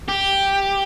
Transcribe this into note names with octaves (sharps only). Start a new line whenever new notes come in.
G4